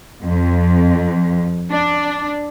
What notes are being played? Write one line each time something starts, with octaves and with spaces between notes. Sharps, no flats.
F2
D4